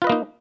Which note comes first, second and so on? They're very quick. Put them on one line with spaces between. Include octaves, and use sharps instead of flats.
F4 B4 D#5 A#3 D#4